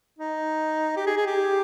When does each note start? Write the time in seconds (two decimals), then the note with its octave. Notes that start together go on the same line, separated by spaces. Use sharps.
0.19 D#4
0.97 G4
1.07 G#4
1.17 G#4
1.27 G4